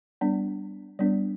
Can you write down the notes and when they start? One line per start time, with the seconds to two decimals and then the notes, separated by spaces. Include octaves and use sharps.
0.21 G3 B3 D4
0.99 G3 B3 D4